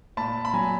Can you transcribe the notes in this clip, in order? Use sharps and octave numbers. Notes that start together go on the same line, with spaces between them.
A#2 A5 B5
B5
F#3 G#5 A#5